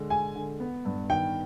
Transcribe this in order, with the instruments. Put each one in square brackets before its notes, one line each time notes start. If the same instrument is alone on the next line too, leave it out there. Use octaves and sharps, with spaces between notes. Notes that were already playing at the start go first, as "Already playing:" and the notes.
Already playing: [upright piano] D3 G#3
[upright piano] G#3 [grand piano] G#5
[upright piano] D3
B3
G2
[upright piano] D#3 [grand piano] G5